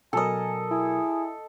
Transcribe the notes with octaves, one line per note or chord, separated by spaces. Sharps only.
B2 F#3 A4 A#4 D#5 G#5
E4 G#4